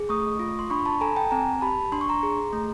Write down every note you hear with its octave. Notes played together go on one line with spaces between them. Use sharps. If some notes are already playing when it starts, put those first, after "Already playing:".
Already playing: G#4
A3 C#6 D#6
F4
C6
D4 B5 C#6
A5 B5
A4 G#5 A#5
G5 A5
C4 G#5 A#5
G4 A5 B5
D4 C6
C#6
A#5 C6
G#4
A3